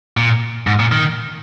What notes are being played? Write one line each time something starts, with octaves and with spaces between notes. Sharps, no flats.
A#2
G#2
A#2
D#3